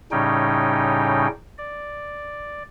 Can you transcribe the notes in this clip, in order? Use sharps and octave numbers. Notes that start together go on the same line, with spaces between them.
A2 C#3 G3 C#4 D#4 G5
D5